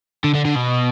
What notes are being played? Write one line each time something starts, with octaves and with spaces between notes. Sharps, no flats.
D3
D3
D3
B2